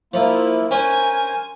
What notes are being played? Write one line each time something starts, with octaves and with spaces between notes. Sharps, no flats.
F3 A#3 E4 F4
C#4 A#4 C5 G#5